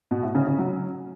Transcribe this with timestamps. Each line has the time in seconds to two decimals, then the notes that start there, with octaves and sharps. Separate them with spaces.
0.11 B2
0.23 A2
0.35 C#3
0.47 C#3
0.58 F#3